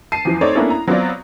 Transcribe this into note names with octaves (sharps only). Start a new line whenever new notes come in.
A5 C7 D#7
E2 E3 F3
A3 C4 D#4 C#5 D5
A#3 B3 C#4 D4 E4 A4
A#5
F#3 B3 C4 F4 D5